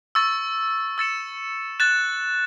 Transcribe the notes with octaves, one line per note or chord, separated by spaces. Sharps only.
C#6 E6 A6
E6 A6 C#7 E7
F#6 A6 E7